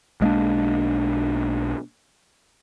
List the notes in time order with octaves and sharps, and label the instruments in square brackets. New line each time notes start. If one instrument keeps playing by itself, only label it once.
[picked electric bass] B1 G#3 A#3 D4